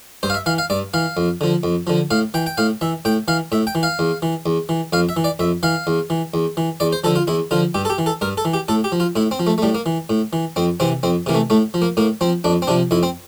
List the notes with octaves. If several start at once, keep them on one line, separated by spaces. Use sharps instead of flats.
G2 C5
F5
E5
E3 F5
F5
G2 D5
E3 F5
F2
D3 F3
F2
D3 F3
A2 F5
E3 G5
G5
A2 F5
E3 E5
A2 G5
E3 F5
A2 E5
G5
E3
F5
E2
E3
E2
E3
F2 F5
E5
E3
D5
F2 E5
E3 F5
E2
E3
E2
E3
E2 D5
C5
D3 F3 A4
F4
E2 E4
D3 F3 F4
G2 G4
A4
G4
E3
A4
G2 A#4
A4
E3
G4
A2 A4
G4
F3
F4
A2 E4
C4
F3
A3
A3
A2 G3
A#3
E3
A2
E3
F2 C4
C3 E3 C4
F2 C4
C3 E3 A#3
A3
A2 A3
F3
A#3
A2 A#3
F3 C4
F2 D4
C4
C3 F3 D4
F2 E4
C4